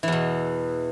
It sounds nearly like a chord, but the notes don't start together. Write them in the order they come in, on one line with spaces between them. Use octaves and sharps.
E3 E2 B2